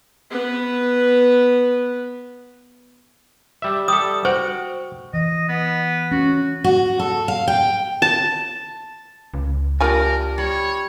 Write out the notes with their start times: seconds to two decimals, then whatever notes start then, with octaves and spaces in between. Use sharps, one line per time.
0.31 B3 B4
3.62 G3 E5
3.88 G3 A4 D#6
4.25 F#4 C5 F#5 G5
5.14 E3 D#5
5.48 B3
6.12 C#4 F#4
6.64 F#4
6.99 A4
7.28 F5
7.48 G5
8.02 A5
9.34 C#2
9.80 A#3 D4 F4 G4 A#4 G#5
10.38 G3 C#5